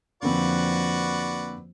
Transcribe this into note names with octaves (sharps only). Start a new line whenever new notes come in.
F2 D3 A#3 C4 F#4 B4 D5